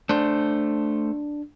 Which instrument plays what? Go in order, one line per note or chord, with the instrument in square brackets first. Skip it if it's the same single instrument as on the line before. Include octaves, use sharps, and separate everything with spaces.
[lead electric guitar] A3 C5 [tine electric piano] D4